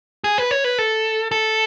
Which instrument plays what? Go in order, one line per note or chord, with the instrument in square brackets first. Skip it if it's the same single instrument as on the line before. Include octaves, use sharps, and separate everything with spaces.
[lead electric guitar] G#4
B4
C#5
B4
A4
A4